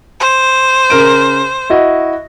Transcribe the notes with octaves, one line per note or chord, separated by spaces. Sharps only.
C5
C#3 A#4 D7
E4 F#4 D#5